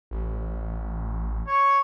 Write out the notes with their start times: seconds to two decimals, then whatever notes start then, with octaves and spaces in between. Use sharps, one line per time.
0.11 A1
1.47 C#5